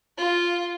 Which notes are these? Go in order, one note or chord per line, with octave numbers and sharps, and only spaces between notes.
F4